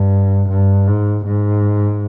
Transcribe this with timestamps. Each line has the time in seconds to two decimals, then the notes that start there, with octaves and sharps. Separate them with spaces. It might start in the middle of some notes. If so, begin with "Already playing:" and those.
Already playing: G2
0.50 G2
0.87 G#2
1.25 G#2